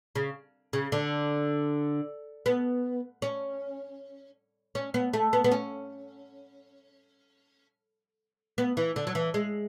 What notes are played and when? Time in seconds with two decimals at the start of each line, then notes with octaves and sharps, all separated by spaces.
0.15 C#3
0.73 C#3
0.92 D3
2.46 B3
3.22 C#4
4.75 C#4
4.94 B3
5.13 A3
5.33 B3
5.44 B3
5.52 C#4
8.58 B3
8.77 E3
8.96 D3
9.07 F#3
9.15 E3
9.34 G#3